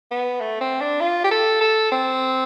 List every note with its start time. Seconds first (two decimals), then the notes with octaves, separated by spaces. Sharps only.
0.11 B3
0.40 A3
0.61 C4
0.81 D4
1.01 F4
1.24 G4
1.31 A4
1.61 A4
1.92 C4